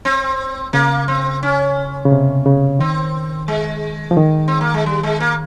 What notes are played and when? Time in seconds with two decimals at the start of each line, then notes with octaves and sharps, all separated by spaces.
0.05 C4
0.73 C#3 A#3
1.08 C4
1.43 C#4
2.05 C#3
2.12 C3
2.45 C#3
2.79 D#3 C4
3.48 G#3
4.11 F3
4.17 D#3
4.48 C4
4.61 A#3
4.74 G#3
4.86 G3
5.03 G#3
5.20 A#3